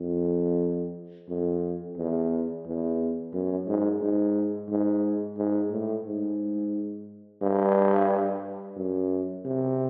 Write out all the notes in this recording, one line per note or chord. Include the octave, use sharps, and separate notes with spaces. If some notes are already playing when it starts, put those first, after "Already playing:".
Already playing: F2
F2
E2
E2
F#2
G#2
G#2
G#2
G#2
A2
G#2
G2
F#2
C3